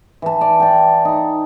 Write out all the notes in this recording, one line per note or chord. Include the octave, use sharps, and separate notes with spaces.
E3 A5
D5
D5 G5
D#4 C6